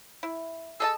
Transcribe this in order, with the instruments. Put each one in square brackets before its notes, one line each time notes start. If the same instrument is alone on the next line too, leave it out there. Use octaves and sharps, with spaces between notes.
[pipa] E4
[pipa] G#4 D#5 A5 [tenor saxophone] A4